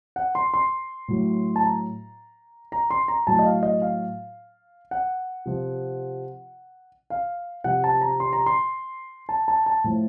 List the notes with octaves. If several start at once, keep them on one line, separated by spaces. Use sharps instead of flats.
F#5
C6
C6
A2 F#3
A5
A#5
A#5
C6
A#5
A2 F#3 A5
D#5
F5
D#5
F5
F#5
C3 F3
F5
C3 F3 F#5
A5
A#5
C6
A#5
C6
A5
A5
A5
A2 F3